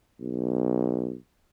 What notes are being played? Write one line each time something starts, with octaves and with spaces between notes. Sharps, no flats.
B1